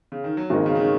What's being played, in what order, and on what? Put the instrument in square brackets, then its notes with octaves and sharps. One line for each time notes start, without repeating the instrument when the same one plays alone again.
[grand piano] C#3
D#3
F#3
[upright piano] G#1 F#2 D#3 A#3 [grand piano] G#3
[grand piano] C#3
D#3
C#3